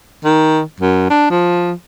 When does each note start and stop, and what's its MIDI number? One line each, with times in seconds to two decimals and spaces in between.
0.24 0.61 51
0.80 1.05 42
1.10 1.29 62
1.30 1.72 53